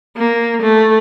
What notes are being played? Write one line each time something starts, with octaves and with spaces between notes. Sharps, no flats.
A#3
A3